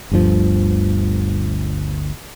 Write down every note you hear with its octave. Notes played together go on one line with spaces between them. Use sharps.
G1 D2 G2 F3